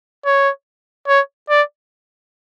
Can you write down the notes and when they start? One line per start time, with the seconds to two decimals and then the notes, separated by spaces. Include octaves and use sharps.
0.25 C#5
1.08 C#5
1.50 D5